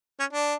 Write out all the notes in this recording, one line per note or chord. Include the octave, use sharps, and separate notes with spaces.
C#4
D4